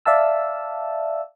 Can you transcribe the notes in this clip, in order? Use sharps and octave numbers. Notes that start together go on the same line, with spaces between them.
D5 E5 F5 A5 E6